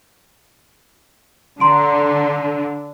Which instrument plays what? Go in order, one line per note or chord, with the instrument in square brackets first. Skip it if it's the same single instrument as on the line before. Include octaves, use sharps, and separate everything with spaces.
[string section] D3 [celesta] A#5 C6 D7